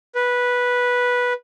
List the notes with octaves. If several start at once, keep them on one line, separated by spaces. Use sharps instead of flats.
B4